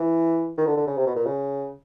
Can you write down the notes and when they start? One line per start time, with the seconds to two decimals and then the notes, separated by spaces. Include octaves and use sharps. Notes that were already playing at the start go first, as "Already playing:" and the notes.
Already playing: E3
0.58 D#3
0.67 D3
0.77 D3
0.87 C#3
0.97 C3
1.06 B2
1.16 A#2
1.26 C#3